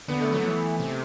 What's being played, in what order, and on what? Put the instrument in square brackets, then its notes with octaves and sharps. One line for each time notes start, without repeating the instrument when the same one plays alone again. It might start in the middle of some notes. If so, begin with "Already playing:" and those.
[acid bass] D3 [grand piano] B3
[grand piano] A3
[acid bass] F#3 [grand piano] B3
[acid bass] E3
C3